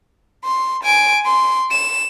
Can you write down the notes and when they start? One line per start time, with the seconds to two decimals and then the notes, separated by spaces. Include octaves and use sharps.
0.45 C6
0.83 G#5 D7
1.26 C6
1.71 E7